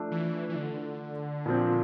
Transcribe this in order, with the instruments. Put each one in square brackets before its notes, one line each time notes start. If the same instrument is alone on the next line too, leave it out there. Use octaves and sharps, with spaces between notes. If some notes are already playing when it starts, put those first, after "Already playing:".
Already playing: [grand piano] F3 A3 D4
[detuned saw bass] E3
E3
D3
[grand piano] A#2 F3 C4